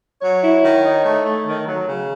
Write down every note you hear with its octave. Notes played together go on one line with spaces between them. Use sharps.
F#3 C#5
E4
D#3
D#4
A3
A3
D#3
F#3
C#3